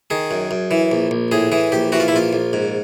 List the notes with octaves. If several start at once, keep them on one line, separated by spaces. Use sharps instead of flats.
D#3 G#4
F#2
F#2
E3
A#1
A#1
A2 G#4
E3 G#4
A#1 G4
E3 F#4
F4
E4
A#1 F4
A#1
G#2